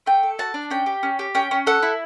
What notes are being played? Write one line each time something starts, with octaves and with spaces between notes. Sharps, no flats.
A3 G5
A4
F#4 A5
D4
C#4 G5
G4
C#4
G4
C#4 G5
C#4
A4 F#5
E4